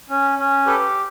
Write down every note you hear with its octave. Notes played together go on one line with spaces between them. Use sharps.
C#4
C#4
G4 A4 B4